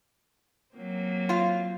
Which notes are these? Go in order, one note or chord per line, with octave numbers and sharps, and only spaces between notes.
F#3 A#3 C4
F4 F5